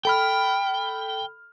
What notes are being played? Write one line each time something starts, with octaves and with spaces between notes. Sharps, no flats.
A4 G5 B5 F6